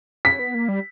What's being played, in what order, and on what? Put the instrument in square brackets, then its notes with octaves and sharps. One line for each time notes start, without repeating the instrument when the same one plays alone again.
[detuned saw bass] C#4 [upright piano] B6
[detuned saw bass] B3
A#3
G3